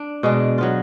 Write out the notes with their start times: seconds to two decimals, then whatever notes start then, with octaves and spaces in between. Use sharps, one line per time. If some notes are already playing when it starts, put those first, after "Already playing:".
Already playing: D4
0.23 B2 G#3 D4
0.58 F#3 B3 F4